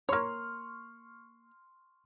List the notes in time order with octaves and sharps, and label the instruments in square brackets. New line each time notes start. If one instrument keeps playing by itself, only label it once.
[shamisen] A#3 C#5 [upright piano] C6 C#6 F6